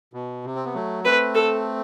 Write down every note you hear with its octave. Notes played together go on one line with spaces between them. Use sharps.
B2
C3
C4
B3
F#3 A3
A3 C4 B4
A4